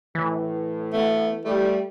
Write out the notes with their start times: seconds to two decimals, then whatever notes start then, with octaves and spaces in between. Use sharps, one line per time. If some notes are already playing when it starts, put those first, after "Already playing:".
0.15 A2 E3
0.93 D2 A3 B3
1.45 G3 A3